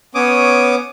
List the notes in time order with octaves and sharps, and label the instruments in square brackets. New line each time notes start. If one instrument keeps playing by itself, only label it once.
[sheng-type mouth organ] B3 C#4 C#5 D6 D#6